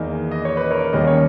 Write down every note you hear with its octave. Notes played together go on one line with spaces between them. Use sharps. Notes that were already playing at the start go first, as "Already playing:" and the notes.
Already playing: E2 D#3 A#3 D#5
D#5
C#5
B4
A#4 C#5
D#2 D#3 G3 A#3 C#4 D#5
C#5